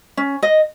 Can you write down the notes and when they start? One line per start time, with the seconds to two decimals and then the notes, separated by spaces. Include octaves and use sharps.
0.17 C#4
0.42 D#5